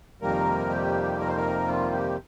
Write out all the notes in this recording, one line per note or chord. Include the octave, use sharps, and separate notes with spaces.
F2 C3 D#3 G3 A#3 A#4
G4
A#4
C5
A#4
F4
G4